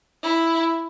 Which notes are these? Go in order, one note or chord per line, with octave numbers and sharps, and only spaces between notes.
E4